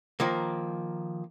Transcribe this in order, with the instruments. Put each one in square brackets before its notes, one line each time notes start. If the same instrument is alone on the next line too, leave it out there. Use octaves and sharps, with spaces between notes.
[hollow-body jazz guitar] D#3 F3 A#3